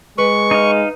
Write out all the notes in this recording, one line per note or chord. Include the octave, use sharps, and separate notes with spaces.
G#3 B4 C#6
D#4 D#5 F5